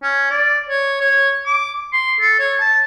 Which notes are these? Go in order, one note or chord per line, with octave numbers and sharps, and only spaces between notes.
C#4
D5
C#5
C#5
D6
C6
A4
C#5
A5